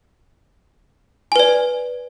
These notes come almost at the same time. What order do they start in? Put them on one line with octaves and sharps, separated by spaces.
G#5 B4 D5